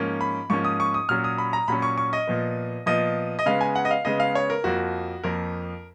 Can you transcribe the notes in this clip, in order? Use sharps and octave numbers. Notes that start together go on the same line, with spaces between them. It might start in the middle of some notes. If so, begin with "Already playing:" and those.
Already playing: G#2 F3 A#3 C#4
B5
G#2 F3 A#3 C#4 C#6
D#6
C#6
D#6
A#2 F#3 C#4 F6
D#6
B5
A#5
A#2 F#3 C#4 B5
C#6
C#6
D#5
A#2 F3 B3
A#2 F3 B3 D#5
D#5
C#3 G#3 B3 F5
G#5
F#5
D#5
F5
C#3 G#3 B3 D#5
F5
C#5
A#4
F2 F3 A#3 F#4
F2 F3 A#3 A#4